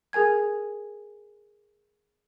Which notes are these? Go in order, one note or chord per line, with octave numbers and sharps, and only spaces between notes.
G#4 A#4 G#5 G#6